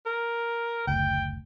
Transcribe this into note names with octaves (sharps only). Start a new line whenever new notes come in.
A#4
F#1 D2 G5